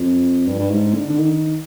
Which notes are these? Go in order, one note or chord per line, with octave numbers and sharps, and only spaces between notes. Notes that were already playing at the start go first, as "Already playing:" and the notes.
Already playing: F2
G2
G2
G#2
D3
D3
D#3